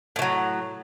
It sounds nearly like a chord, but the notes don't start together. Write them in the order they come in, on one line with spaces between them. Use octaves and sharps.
A2 E3 F#3